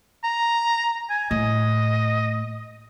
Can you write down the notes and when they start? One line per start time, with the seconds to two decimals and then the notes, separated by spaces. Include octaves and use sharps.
0.24 A#5
1.10 G#5
1.31 A2 D#5